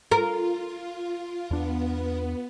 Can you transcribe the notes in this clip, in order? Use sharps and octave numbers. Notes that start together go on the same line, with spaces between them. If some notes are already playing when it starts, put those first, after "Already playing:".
F4 A#4
E2 B3 D4